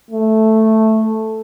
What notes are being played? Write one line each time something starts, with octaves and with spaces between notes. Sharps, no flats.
A3